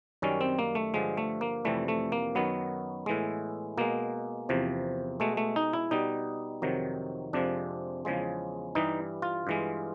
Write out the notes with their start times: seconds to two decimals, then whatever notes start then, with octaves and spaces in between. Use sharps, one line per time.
0.22 F#2 D#3 G3 C#4
0.41 C4
0.59 A#3
0.75 A3
0.94 G2 D3 F3 G#3
1.17 A3
1.41 A#3
1.65 F2 C3 E3 G3 A3
1.88 A3
2.12 A#3
2.35 F#2 D#3 F#3 B3
3.06 A2 E3 G#3
3.77 B2 G#3 A#3
4.49 E2 C3 F3
5.20 B2 G#3 A3
5.37 A3
5.56 D#4
5.73 E4
5.91 B2 G3 D#4
6.62 F2 C3 D#3 F#3
7.33 F2 C3 F3 G#3 D4
8.05 E2 C#3 F3 G#3
8.75 G2 E3 G3 D#4
9.22 F4
9.47 G2 E3 G#3